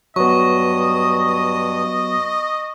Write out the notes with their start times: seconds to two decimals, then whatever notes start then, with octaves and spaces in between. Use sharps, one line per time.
0.16 G2 F#3 B3 D#5 C#6 D#6